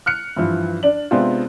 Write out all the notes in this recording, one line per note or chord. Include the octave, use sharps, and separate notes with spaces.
F6 F#6 C#7
G2 E3 F3
D4 D5 F#7
C3 G#3 B3 C4 D4 F4